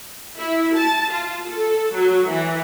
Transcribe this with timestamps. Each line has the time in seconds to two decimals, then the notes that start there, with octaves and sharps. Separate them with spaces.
0.37 E4
0.75 A5
1.11 F4
1.49 A4
1.94 F#3
2.26 E3